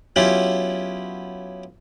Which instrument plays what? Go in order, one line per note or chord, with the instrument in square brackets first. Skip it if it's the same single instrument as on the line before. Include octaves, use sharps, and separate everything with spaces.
[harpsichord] F#3 B3 C#4 E4 F4 G4